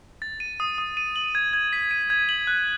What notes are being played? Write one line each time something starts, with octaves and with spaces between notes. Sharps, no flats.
A6
D#7
D#6
D#6
D#7
F#7
G#6
G#6
B6
D#7
G#6
F#7
F#6